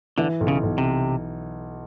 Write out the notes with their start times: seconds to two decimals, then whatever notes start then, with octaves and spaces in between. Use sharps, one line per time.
0.18 D3 E3
0.40 B1
0.48 C#3
0.63 B1
0.78 C3